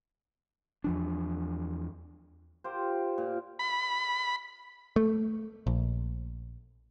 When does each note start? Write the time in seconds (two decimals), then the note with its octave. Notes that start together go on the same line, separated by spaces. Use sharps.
0.84 E2 F3 D4
2.64 F4 G4 A#4 C5
3.18 A#2
3.59 B5
4.96 A3
5.67 A#1